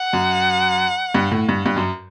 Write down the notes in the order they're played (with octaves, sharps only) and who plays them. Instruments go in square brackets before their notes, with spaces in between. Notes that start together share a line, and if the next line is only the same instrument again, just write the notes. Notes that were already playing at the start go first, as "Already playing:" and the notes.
Already playing: [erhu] F#5
[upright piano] F#2
G2
A2
G2
G2
F#2